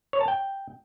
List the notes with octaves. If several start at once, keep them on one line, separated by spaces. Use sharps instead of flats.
C#5
A5
G5